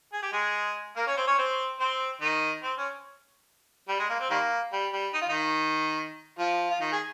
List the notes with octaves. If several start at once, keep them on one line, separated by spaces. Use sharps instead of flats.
G#4
G4
G#3 G#4
A#3 A#4
C#4 C#5
C4 C5
C#4 C#5
C4 C5
C4 C5
D#3 D#4
C4
C#4
G3
G#3
A#3
C4
D#3 G3 A#3
G3
G3
D#4
F4
D#3 D#4
F3 F4
F4
D#3 D#4
G#4